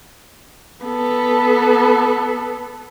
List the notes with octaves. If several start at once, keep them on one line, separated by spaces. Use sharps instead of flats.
B3 A4